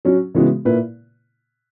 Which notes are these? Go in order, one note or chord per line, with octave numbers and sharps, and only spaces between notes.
F#3 C#4 F#4
C#3 E3 G#3 B3 F#4
A#2 A#3 E4 B4